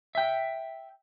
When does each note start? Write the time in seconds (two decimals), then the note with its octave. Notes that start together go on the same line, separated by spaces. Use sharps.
0.15 E5 G5